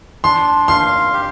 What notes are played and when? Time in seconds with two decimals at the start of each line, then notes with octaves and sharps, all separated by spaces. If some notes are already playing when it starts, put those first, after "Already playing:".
0.24 D4 C6
0.68 F5 C6
1.13 G4